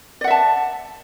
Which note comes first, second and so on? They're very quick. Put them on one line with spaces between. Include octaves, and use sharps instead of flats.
D5 F#5 E5 A5